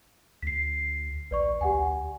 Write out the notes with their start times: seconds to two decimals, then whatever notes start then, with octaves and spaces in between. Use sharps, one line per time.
0.42 D2 B6 C7
1.31 A#1 B4 D5 C#6
1.61 D2 G4 F#5 G#5